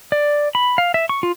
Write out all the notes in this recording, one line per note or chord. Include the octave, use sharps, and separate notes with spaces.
D5
B5
F5
E5
C#6
F4